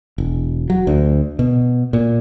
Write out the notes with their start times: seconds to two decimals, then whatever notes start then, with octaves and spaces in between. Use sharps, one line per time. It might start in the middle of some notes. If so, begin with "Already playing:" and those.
0.18 E1
0.70 F#3
0.87 D2
1.39 B2
1.93 A#2